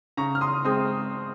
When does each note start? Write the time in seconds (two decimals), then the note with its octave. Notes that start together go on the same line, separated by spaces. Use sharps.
0.17 C#3 A#5 C#6
0.35 F6
0.41 C6 D#6
0.65 G#3 C4 C6 D#6